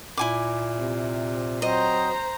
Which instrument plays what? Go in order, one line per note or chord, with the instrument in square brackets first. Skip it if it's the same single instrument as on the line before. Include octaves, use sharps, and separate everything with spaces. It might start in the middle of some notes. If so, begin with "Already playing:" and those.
[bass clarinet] A#2 [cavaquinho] E4 G#5 D6
[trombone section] C3
[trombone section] F#3 C4 [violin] C5 A#5 [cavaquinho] D#5